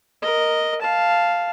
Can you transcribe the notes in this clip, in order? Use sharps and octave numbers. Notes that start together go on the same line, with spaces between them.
A#4 D#5
F5 A5